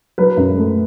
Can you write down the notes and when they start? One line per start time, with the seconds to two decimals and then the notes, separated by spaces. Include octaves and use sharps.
0.18 F#3 B4
0.37 F#2
0.58 A3